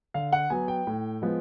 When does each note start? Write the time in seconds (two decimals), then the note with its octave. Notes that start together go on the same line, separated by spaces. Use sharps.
0.14 D3 F5
0.33 F#5
0.50 F#3 B3 G#5
0.68 G5
0.87 A2
1.22 F3 G#3 B3